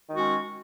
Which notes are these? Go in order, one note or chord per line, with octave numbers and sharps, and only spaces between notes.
D#3 G#3 C#4 F#4